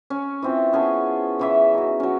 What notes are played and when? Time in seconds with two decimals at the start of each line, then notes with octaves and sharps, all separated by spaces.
0.10 C#4
0.42 E3 C4 F4
0.73 B3 C#4 G#4 A5
1.39 C#3 E3 E5
1.74 D#4 F#4
2.00 F#3 C#4